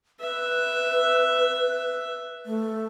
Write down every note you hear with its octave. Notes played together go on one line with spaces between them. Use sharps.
B4 E5
A3